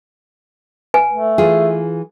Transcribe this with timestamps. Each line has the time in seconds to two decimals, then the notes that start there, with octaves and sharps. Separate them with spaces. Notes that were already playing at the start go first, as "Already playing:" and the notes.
0.94 B4 G#5
1.13 A3
1.38 E3 F4 G#4